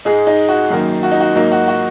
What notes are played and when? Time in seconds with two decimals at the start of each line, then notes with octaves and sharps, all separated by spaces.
0.05 G#2 G#3 D#4 G#4
0.27 D#4
0.49 F#4
0.70 F#2 D#3 F#3 A#3 D#4
1.03 F#4
1.11 D#4
1.21 F#4
1.35 G#2 F#3 A#3 D#4
1.52 F#4
1.68 F#4